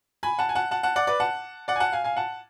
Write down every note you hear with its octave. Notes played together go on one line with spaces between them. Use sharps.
G#5 B5
F#5 A5
G#5
F#5 A5
F#5 A5
F#5 A5
D5 F#5
B4 D5
F#5 A5
D5 F#5
G#5
F#5 A5
F5 G#5
F5 G#5
F#5 A5